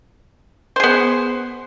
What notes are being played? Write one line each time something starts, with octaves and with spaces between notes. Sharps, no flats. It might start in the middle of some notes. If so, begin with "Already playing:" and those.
B3 G#4 C5